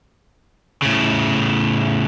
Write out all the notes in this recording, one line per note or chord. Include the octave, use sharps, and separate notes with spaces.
A2 C#3